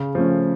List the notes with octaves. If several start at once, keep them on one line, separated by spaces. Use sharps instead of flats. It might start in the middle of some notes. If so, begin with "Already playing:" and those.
Already playing: C#3
F3 A3 C#4